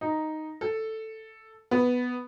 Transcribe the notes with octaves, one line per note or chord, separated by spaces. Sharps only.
D#4
A4
B3